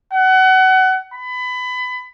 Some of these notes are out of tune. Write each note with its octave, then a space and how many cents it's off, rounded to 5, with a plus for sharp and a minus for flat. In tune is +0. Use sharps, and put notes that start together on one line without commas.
F#5 +25
B5 +25